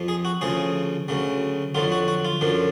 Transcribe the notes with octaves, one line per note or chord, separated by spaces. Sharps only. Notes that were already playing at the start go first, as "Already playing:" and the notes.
Already playing: F2 F3
G#4
F#4
D2 C#3 F3 G#4
D2 C#3 F#3
F2 D3 F#3 F4
F#4
F#4
F4
F#2 D3 F3